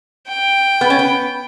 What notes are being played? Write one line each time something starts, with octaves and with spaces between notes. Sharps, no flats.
G5
B3
C#4
B3